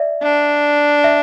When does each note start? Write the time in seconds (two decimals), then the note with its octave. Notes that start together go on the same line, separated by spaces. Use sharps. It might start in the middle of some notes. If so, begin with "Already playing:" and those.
Already playing: D5 E5
0.23 D4
1.04 E5